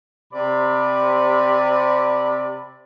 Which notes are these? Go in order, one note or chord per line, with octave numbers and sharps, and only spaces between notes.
C3 D5 B5